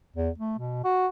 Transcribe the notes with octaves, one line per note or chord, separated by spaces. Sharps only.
E2
A3
B2
F#4